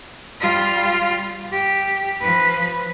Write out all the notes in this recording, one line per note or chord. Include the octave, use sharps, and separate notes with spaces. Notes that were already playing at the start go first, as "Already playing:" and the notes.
G3 F4
G4
F3 B4